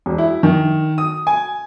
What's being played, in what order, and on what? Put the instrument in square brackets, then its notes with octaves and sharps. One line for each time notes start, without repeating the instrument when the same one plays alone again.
[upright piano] E1
E4
D#3
D#6
G#5